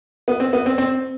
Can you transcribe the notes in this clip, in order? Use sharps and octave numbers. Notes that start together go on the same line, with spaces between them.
B3
C4
B3
C4
C4